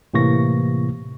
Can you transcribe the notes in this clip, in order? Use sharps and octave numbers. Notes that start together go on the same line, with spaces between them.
A2 C3 E3 A#3 C#6 A#6